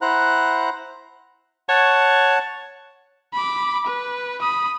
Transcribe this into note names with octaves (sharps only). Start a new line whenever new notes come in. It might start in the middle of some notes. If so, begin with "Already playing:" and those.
E4 C5 F#5 A#5 F#6
C#5 F#5 A5
B5 D6
B4
B5 D#6